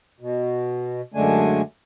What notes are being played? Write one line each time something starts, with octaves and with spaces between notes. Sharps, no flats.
B2
F#2 D3 G#3 A3 D4 G#5